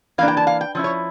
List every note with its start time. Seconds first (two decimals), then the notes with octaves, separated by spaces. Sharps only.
0.18 E3 A#3 D4 F5
0.28 G5
0.37 A5
0.47 F5
0.61 G5
0.75 F3 C#4 E4
0.84 C#5